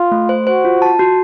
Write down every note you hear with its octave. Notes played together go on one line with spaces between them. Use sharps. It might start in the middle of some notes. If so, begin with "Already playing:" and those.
Already playing: F4
A3
C5
F#4 C5
F4
A5
F#4